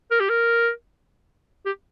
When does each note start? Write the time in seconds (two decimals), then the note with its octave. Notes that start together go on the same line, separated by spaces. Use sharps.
0.11 A#4
0.20 G4
0.29 A#4
1.65 G4